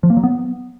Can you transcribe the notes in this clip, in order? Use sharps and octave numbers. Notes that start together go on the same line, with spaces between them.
F3
A#3
F#3
B3